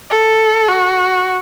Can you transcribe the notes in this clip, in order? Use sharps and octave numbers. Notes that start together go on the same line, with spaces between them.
A4
F#4